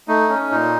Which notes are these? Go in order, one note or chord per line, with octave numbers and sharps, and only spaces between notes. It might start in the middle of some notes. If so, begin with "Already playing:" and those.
A3 D#4
C#4
A#2 D#4